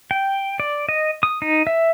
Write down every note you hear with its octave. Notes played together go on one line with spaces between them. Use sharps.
G5
D5
D#5
D#6
D#4
E5